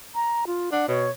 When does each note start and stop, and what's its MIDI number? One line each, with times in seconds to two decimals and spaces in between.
0.15 0.45 82
0.47 0.70 65
0.72 0.86 62
0.72 0.85 78
0.88 1.09 47
0.88 1.11 73